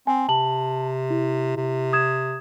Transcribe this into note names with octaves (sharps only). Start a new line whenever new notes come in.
C4 G#5
C3 A5 F#7
E4
C3
D#6 G#6 E7